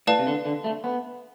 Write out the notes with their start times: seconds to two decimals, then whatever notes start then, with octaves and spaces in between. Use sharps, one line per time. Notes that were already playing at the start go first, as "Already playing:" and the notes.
0.07 A2 B4 D5 F5 A5
0.19 C3
0.27 D3
0.45 D3
0.64 A3
0.84 B3